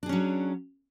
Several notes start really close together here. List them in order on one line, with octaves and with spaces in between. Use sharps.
D4 G#4 C#4 F#3